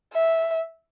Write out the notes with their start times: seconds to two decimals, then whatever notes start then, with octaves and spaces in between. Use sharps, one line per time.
0.13 E5